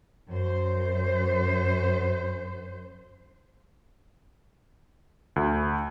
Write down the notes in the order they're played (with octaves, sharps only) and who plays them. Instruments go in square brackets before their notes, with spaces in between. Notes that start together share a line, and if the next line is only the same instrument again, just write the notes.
[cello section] F#2 C5
[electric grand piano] D2